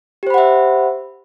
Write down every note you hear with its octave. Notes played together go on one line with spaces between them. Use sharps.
G4 C5 E5 F#5 B5